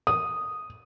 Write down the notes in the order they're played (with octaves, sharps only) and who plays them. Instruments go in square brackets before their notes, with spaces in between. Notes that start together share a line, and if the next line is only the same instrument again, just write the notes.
[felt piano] D#6